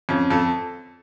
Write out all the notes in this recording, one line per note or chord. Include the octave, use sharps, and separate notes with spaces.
F2 C#4
F2 A4